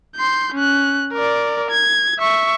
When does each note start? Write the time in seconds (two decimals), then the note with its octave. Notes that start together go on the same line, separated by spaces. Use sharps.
0.16 C6 G6
0.54 C#4 F#6
1.13 A#4 D5
1.70 G#6
2.19 E5 C#6